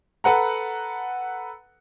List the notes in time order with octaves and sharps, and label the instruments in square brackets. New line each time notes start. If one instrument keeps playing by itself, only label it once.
[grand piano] A4 B4 F#5 A#5